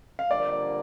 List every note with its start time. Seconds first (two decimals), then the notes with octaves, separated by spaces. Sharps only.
0.19 F5
0.30 F2 D3 G3 A#3 D5